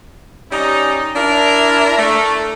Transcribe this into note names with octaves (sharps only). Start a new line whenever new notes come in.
G3 C#4 D#4
D4 E4 A#4
A3